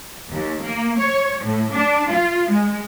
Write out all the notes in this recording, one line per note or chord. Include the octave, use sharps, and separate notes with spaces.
D#2
A#3
C#5
A2
D4
F4
G#3